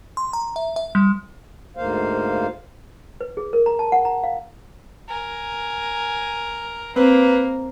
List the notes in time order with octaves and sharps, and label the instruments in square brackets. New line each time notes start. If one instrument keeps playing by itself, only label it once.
[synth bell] C6
A#5
E5
E5
G3
[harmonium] D2 G#2 A#3 C5 F5
[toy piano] B4
G#4
A#4
A#5
A5
F#5
A#5
F5
[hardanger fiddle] A#4 G#5
[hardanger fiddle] A#3 [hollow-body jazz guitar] C4 [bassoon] B4